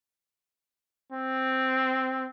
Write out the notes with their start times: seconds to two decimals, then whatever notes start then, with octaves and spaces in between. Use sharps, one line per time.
1.12 C4